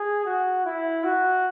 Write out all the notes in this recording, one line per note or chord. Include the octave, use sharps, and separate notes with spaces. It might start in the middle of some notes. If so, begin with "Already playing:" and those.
Already playing: G#4
F#4
E4
F#4